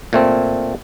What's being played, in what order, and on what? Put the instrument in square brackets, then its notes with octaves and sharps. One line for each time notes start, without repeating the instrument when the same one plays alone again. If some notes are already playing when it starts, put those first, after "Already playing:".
[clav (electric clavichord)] A#2 A3 C4